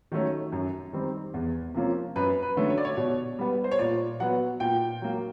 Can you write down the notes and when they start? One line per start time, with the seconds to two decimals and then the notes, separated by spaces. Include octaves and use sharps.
0.12 D#3 F#3 A3 C#4
0.52 F#2
0.93 D#3 G3 C4
1.34 E2
1.74 C3 F3 A#3 C#4
2.16 F#2 B4
2.43 B4
2.56 D3 F#3 A3 C#4
2.70 C#5
2.78 D5
2.85 C#5
2.97 B2
3.39 G3 B3
3.64 C5
3.71 C#5
3.79 A#2 D5
4.20 F#3 B3 F#5
4.60 A#2 G5
5.02 F#3 A#3